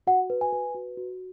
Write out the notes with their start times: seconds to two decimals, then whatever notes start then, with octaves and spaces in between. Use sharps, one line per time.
0.07 F#4 F#5
0.30 B4
0.41 G#5
0.52 B4
0.74 F#4
0.97 F#4